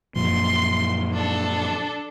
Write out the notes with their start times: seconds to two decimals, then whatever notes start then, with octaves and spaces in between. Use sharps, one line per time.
0.16 F#2 A#2 F3 C6
1.13 D4 A4